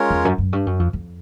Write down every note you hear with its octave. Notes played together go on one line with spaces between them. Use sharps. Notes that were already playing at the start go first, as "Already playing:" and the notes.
Already playing: G#3 C#4 F4 A#4 C#5
E2
F#2
F#2
G2
F#2
F2
F2